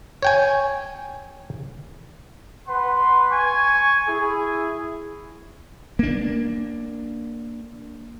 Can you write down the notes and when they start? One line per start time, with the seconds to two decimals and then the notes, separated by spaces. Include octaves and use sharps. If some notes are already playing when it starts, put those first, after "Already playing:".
0.22 C#5 G5 G#5
2.68 B4 F#5 C6
3.32 G#5 C#6
4.08 E4 G#4
5.99 A#3 D4